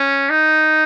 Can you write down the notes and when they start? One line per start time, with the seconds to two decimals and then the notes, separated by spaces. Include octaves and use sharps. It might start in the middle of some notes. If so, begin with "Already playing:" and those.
Already playing: C#4
0.30 D#4